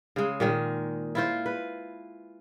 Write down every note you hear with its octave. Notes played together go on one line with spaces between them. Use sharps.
C#3 G#3
A#2 D#3 G#3
E4 F4 C5
B4